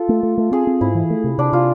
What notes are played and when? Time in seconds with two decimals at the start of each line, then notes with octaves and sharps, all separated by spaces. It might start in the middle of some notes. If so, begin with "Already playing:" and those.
Already playing: F4 A4
0.09 A3
0.23 A3
0.38 A3
0.52 C4 G#4
0.67 C4
0.81 G#2 E4
0.95 E3
1.10 A3
1.24 C3
1.38 C3 D4
1.53 C3 F4